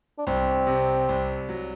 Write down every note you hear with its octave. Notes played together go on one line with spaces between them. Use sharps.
D4
C2 C4
C3
C2
F#3